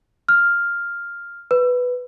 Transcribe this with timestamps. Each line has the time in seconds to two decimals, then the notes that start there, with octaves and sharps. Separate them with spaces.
0.29 F6
1.51 B4